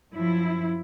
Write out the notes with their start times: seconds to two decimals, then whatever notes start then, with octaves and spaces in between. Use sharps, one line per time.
0.13 F#2 F3 E4